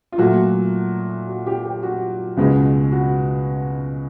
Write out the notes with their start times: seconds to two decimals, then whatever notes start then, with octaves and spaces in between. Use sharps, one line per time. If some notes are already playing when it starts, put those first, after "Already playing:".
0.12 F4
0.18 A#2 F#3 A3 F#4
1.28 F#4
1.46 G4
1.65 G4
1.83 F#4
2.37 C#2 B2 G#3
2.92 F#4